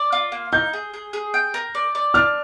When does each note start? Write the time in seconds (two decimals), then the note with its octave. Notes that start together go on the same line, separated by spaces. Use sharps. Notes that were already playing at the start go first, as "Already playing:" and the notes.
Already playing: D5
0.12 F4
0.32 A#3
0.52 D#4 G6
0.73 G#4
0.94 G#4
1.13 G#4
1.34 G5
1.54 A#4
1.75 D5
1.95 D5
2.14 D4 F6